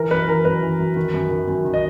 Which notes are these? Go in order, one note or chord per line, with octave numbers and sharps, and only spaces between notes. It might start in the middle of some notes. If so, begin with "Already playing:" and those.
Already playing: E3 A#4
F#2 B4
E3 A#4
F#2 B4
E3
F#2
D#3
F#2
D#3
F#2
D#3
D#5